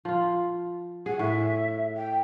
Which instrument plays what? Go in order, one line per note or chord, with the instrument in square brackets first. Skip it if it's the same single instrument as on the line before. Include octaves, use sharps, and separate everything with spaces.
[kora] F3 F4
[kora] G#4 [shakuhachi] F#5
[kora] A2 [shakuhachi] E5
[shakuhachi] G5